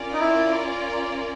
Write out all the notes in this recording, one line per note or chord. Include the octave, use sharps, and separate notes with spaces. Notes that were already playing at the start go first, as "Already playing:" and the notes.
Already playing: C#4 F4 A#4 D5
D#4
E4